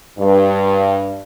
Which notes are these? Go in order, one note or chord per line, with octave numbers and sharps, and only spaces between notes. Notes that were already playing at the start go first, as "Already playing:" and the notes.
G2